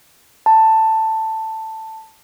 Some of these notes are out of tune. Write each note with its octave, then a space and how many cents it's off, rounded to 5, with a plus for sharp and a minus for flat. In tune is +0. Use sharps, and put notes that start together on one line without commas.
A5 +10